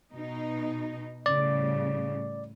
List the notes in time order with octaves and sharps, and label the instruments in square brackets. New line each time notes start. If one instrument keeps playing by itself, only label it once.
[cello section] B2 D#4
[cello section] A2 C#3 G3 [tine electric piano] D5